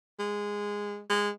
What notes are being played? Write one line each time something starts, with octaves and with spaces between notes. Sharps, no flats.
G#3
G#3